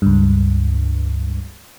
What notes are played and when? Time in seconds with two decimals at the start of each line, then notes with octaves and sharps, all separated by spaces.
0.02 C#2 G2